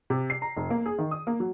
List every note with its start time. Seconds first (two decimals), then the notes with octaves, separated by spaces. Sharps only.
0.10 C3
0.30 C7
0.42 A#5
0.57 F1
0.70 A#3
0.86 G#4
0.98 D#3
1.11 D#6
1.27 A#3
1.40 F#3